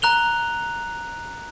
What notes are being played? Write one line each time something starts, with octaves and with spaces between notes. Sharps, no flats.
A#5 F#6 F7 G7